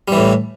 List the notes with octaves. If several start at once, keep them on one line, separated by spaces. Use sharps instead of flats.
A2 E3 G3